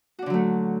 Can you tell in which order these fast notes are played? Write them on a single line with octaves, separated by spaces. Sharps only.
F#4 D4 D3 F#3 A3